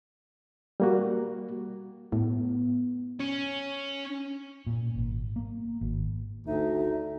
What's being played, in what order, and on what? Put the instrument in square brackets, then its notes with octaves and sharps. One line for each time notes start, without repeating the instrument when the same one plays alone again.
[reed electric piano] G3 A#3 F#4
[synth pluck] A2 [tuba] B3
[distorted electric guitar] C#4
[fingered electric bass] A#2
G#1
A#3
G#1
[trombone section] D2 [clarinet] D#4 [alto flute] E5